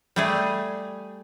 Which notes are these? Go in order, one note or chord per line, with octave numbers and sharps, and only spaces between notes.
G3 A3 G#4